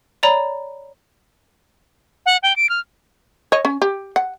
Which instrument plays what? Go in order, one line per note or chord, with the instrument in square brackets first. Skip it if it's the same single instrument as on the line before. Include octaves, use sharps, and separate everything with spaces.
[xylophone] C#5 D5 A#5 B5
[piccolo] F#5
G5
D7
F6
[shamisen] C#5 D#5
C#4
G4
F#5